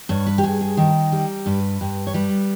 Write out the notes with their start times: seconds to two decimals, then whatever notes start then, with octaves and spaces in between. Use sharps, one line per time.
0.09 G2 C#5
0.27 B4
0.38 G4
0.43 G2 G#4
0.61 G#4
0.77 D#3 A#4
1.12 G3
1.46 G2 B4
1.81 G2
2.07 C#5
2.14 G3 B4